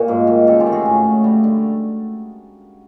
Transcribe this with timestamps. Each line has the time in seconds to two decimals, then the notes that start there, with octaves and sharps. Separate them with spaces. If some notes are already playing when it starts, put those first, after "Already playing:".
Already playing: A#2 F#4
0.08 G#2
0.27 D#3
0.47 C#3 G4 A4
0.60 F4 G4
0.66 A3
0.72 F#4 G#4
0.86 A2
1.04 A2
1.24 G3
1.44 D3